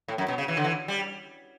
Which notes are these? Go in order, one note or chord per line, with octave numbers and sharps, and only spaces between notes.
A2
F#2
B2
C#3
E3
D3
E3
G3